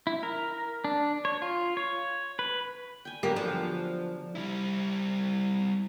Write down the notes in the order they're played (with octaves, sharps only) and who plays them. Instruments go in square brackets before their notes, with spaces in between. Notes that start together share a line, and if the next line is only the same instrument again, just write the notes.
[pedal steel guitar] E4
A#4
D4
C#5
F4
C#5
B4
[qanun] G5 G#5
[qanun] D3 F#3 B3 [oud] A#3 G4
[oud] F3 [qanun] D4
[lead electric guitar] G3 E4